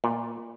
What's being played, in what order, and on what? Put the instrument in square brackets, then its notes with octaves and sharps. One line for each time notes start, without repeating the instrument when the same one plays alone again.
[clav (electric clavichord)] A#2